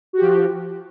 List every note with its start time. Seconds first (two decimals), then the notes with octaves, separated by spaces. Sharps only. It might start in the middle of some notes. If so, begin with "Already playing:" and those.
0.13 F#4
0.17 G4
0.21 F3